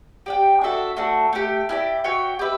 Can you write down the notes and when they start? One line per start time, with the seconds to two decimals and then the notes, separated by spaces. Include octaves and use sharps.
0.26 G4 D5 G5
0.61 D4 F#4 A4 E5
0.97 A3 D4 F#4 A4
1.33 A3 D4 G4
1.69 E4 G4 D5
2.04 F#4 C#5 E5 G5
2.39 G4 B4 E5